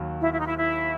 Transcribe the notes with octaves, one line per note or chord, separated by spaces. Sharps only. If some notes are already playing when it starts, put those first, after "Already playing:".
Already playing: D#2 F#3
E4
E4
D#4
E4
E4